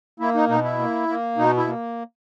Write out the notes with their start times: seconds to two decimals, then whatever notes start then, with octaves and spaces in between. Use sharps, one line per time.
0.20 A#3 E4
0.35 D#4
0.49 B2 D#4
0.64 E4
0.79 A#3
1.08 A#3
1.37 B2 D#4
1.57 E4
1.67 A#3